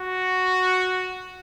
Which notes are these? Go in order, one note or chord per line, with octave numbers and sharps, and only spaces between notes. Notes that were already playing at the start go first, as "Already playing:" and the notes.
Already playing: F#4